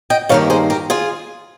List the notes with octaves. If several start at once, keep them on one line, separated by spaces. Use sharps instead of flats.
D#5 G5
G2 D#3 A#3 C#5 F5
G#4 C5
G4 A#4
F4 G#4